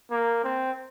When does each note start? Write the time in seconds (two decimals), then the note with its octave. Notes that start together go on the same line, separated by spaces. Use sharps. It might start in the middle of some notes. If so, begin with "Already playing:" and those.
0.11 A#3
0.44 C4